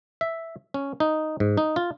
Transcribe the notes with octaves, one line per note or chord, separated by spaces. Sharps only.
E5
C#4
D#4
G#2
D#4
F4